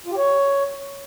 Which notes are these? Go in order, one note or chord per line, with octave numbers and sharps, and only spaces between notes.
F4
G4
C#5